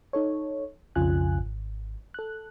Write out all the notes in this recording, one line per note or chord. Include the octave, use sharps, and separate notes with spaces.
D#4 A4 C#5
B1 F2 C#3 F4 G#5 F#6
G#1
A4 F#6